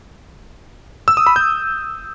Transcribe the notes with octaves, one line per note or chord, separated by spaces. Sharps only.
E6
D#6
B5
G6